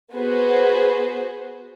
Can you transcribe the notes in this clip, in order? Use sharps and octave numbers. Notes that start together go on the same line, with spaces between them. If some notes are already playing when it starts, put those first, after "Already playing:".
B3 F#4 G#4 B4 C5